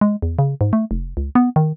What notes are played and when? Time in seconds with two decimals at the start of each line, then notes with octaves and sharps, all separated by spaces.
0.01 G#3
0.22 E2
0.39 C#3
0.61 G#2
0.73 A3
0.91 F1
1.17 C#2
1.35 B3
1.56 D#3